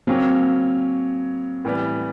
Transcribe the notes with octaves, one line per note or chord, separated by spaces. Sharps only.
C#3 F#3 A#3 C4 C#4
A2 E3 G3 B3